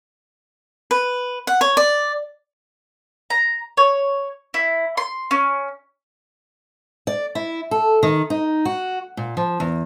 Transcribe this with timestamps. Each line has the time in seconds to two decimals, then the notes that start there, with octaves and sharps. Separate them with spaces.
0.91 B4
1.47 F#5
1.61 C#5
1.77 D5
3.30 A#5
3.77 C#5
4.54 E4
4.97 C6
5.31 C#4
7.07 D5
7.35 E4
7.71 A4
8.03 D#3
8.30 D#4
8.65 F#4
9.17 A#2
9.37 F3
9.60 E2